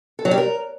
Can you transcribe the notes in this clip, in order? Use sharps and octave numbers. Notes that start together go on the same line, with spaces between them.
A4
F#3
G3
A#4